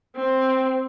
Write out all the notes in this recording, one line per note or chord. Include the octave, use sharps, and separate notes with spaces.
C4